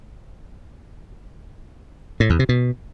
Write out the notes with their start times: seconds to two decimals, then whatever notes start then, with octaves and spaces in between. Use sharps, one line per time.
2.20 A2
2.30 E2
2.39 C3
2.49 B2